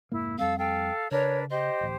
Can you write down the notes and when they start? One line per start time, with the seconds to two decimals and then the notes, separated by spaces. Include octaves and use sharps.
0.12 F1 G#2 A#3 E4
0.39 F2 G3 C4 A4 F5 E6
0.59 A4 F5 G5
1.11 C#3 D4 A#4 B4 C#5
1.51 G4 C5 D#5
1.81 D1 A1